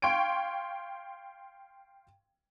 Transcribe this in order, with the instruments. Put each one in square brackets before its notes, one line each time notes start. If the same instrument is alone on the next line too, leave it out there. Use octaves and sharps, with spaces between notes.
[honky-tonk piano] F5 G5 C6 C#6 G#6 D7